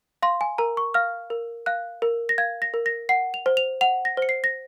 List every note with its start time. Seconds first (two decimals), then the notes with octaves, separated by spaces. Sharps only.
0.22 F5 C6
0.41 G#5
0.58 A#4 A#5
0.77 C#6
0.94 F5 F6
1.30 A#4
1.66 F5 F#6
2.02 A#4
2.29 A#6
2.38 F5 G#6
2.62 A#6
2.74 A#4
2.86 A#6
3.09 F#5 C7
3.34 F7
3.46 C5
3.57 F7
3.81 F#5 F7
4.05 A#6
4.17 C5 C#7
4.29 C7
4.44 A#6